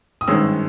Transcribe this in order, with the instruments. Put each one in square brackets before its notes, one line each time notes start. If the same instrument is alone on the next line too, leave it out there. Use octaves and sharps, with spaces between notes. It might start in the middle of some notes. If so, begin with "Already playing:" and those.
[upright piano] D#6
G#1 G2 D#3 G#3 C#4 E6